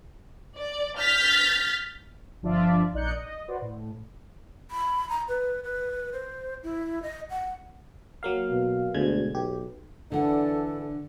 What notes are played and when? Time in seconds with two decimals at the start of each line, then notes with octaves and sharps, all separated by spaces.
0.57 D5
0.99 F6 G6 A6 B6
2.42 G1 F3 D4 F4 D5 E5
2.93 A#1 D#4 D5 F#6 G6 C#7
3.13 D#5
3.48 F#4 B4 C5 D5
3.62 A2
4.71 B5
5.09 A#5
5.28 B4
5.64 B4
6.13 C5
6.64 E4
7.03 D#5
7.30 F#5
8.23 F#3 A#3 F5
8.51 B2
8.94 D2 B2 G#3 G#6
9.35 B1 G4
10.12 D3 E3 D4 A4 F#5